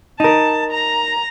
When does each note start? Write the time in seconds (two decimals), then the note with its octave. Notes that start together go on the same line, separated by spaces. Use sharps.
0.20 D#4 A#4 A5
0.71 A#5